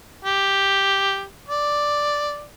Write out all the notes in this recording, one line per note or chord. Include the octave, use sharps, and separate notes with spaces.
G4
D5